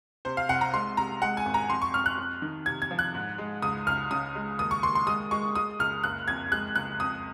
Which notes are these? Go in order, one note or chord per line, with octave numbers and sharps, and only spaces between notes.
C3 C5
F5
C2 F#5
A#5
G#3 C6
C3 A#5
G#3 F#5
G#5
G#1
A#5
F2 C6
C#6
F2 F6
F#6
F2
D#3
C3 G#6
G#6
F3
F#6
G#2
G#3
C#2 D#6
C#2 F6
C#3 D#6
G#3
D#2 D#6
C#6
D#2 C6
C6
G#3 D#6
G#3 C#6
G#3 D#6
C#2 F6
F#1 F#6
F2 G#6
G#3 F#6
C#2 F#6
F2 D#6